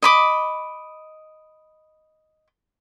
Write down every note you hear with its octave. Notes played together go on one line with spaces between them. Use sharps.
D#5 B5 D6